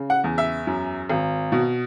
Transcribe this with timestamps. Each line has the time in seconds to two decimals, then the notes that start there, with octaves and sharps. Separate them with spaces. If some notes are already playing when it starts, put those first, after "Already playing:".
Already playing: C#3
0.10 F#5
0.24 E2
0.38 E5
0.67 F#2
1.09 G#1
1.52 B2